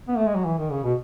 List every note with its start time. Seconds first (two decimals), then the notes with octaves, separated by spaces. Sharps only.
0.08 B3
0.16 A3
0.26 G#3
0.35 F#3
0.45 E3
0.58 D#3
0.71 C#3
0.84 B2